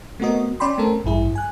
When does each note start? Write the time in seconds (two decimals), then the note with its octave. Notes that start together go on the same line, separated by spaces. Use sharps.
0.20 A3 B3 C4 F#4 A#4 D#5
0.60 C#4 D5 G5 B5 C6
0.78 A3 C4 C#4 A4 A#4
1.04 A1 G2 E4 G#4
1.35 G#5 F#6